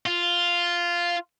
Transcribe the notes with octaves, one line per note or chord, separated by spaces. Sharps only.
F4